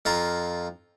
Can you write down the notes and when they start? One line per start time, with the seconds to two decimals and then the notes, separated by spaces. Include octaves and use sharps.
0.05 F2 F4 A#5